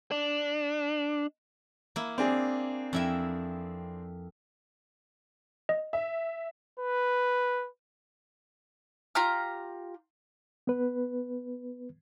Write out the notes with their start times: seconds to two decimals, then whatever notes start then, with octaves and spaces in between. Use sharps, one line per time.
0.11 D4
1.96 A#3 E4
2.18 C4 D4 G#4
2.93 F2 E4 E5
5.69 D#5
5.93 E5
6.79 B4
9.15 F4 G4 A#5 F6
10.67 B3 B4